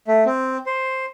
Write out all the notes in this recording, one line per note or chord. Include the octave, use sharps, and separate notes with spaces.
A3
C4
C5